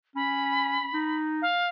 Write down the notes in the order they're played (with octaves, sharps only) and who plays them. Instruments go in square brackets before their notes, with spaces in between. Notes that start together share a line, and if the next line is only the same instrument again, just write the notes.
[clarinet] C#4 [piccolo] B5
[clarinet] D#4
[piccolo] F5